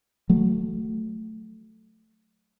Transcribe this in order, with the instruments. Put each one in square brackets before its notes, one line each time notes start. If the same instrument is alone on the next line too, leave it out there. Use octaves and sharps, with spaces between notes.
[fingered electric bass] F#3 A3